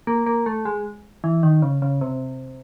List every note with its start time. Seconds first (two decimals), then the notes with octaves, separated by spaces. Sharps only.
0.07 A#3
0.26 A#3
0.46 A3
0.65 G#3
1.24 E3
1.43 D#3
1.62 C#3
1.82 C#3
2.01 C3